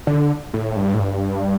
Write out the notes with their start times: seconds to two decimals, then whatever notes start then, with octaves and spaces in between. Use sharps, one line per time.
0.07 D3
0.54 A2
0.76 G2
0.94 A2
1.00 G2